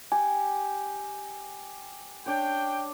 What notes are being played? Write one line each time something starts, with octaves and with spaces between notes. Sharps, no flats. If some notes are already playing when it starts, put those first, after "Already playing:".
G4 G#5
D4 C#5 G5